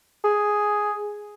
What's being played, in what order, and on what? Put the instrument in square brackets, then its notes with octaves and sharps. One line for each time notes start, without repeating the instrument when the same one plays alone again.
[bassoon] G#4